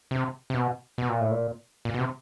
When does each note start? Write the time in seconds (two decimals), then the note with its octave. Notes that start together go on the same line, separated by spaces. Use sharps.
0.11 C3
0.50 C3
0.54 B2
0.98 B2
1.09 A#2
1.20 A2
1.31 A#2
1.85 A#2
1.94 B2
2.00 C3